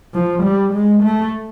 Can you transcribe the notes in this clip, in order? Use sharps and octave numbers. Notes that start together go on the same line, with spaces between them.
F3
G3
G#3
A3